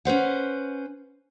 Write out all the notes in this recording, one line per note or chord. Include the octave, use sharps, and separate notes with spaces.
C#4 B4 C5 F#5